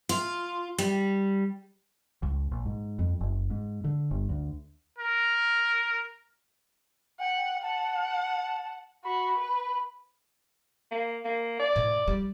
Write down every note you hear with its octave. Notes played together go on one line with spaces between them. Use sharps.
F4
G3
C#2
A#1
G#2
F2
F#1
G#2
D3
G1
D2
A#4
F#5 G5
F#5 A5
F#4 B5
B4
A#3
A#3
D5
A2
G3